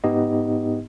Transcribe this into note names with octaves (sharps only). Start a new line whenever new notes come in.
G#2 B3 D#4 G4 D#5